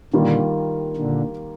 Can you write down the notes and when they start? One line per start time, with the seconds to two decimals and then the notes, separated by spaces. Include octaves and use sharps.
0.13 A#2 D3 D#3 G3 A#3 F4
0.97 A#2 D3